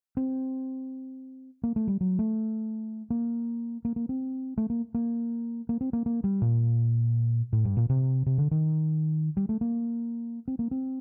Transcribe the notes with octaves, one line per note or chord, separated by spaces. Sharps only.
C4
A#3
A3
G3
F#3
A3
A#3
A#3
A#3
C4
A3
A#3
A#3
A#3
C4
A#3
A#3
G3
A#2
A2
G2
A#2
C3
C3
D3
D#3
G3
A3
A#3
C4
A#3
C4